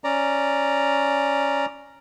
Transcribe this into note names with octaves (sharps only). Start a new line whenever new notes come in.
C#4 D5 A#5